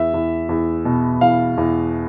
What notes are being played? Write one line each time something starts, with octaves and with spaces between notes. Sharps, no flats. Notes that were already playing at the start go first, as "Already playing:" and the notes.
Already playing: E2 E5
E2
E2
B2
E2 F5
E2